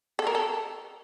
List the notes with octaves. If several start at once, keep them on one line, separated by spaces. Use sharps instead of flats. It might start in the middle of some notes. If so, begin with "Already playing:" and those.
A4
A#4
A4